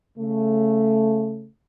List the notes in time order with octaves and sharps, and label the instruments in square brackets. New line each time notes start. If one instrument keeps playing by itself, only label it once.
[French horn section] C#3 A3